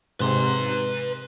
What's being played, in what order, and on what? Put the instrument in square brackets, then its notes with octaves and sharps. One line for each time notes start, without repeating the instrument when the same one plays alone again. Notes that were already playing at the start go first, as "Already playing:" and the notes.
[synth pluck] G#2 C3 [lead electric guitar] B4 C6